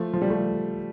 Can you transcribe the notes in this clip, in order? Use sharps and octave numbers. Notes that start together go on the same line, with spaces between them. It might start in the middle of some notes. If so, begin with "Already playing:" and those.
Already playing: F3 A3
F3
G3
F3 A3